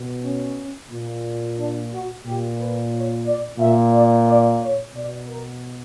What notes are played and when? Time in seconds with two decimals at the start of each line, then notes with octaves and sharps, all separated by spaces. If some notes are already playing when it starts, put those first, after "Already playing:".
Already playing: B2
0.23 C#4
0.90 A#2
1.57 D4
1.91 F#4
2.24 A#2 G4
2.58 B4
2.92 C#5
3.25 D5
3.59 A#2 E5
3.92 D5
4.26 D5
4.60 C#5
4.93 B2 D5
5.27 A#4